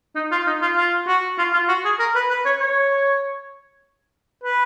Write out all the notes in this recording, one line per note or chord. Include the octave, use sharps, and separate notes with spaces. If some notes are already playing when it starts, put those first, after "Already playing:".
D#4
F4
D#4
F4
F4
F#4
F4
F4
F#4
G#4
A#4
B4
B4
C#5
C#5
B4